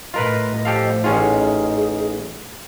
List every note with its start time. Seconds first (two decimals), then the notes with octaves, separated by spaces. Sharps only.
0.14 A2 F4 A#4 B4 D#5
0.65 F3 G4 A4 F5
1.04 A1 C#4 D#4 F4 G#4